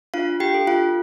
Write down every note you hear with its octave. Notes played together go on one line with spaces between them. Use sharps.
D4 F4 F5
G4 G5
A4
F4 F5